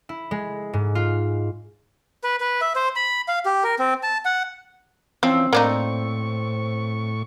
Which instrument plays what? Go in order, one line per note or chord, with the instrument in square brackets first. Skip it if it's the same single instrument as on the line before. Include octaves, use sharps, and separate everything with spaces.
[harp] E4
G#3
G#2
F4
[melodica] B4
B4
E5
C5
B5
F5
G4
A#4
C4
A5
F#5
[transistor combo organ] E3 C#4 [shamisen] F3 [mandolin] C4
[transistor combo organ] A2 C#6 [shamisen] A#3 D4 D#4